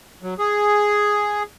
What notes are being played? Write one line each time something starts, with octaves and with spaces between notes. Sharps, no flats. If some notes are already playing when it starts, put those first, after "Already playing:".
F#3
G#4